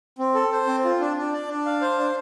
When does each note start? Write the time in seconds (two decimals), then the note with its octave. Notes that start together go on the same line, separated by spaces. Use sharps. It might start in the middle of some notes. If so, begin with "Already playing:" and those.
0.19 C4
0.35 A4
0.52 C5
0.67 C4
0.84 F4
1.00 D4
1.17 D4
1.33 D5
1.49 D4
1.66 F5
1.81 C5
1.98 D4